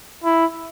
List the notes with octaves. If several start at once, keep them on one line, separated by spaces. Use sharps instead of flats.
E4